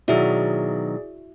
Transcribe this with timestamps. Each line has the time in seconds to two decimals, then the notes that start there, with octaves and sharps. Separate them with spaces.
0.08 B2 D#3 F#3 E4 F#4 G#4 D5 E5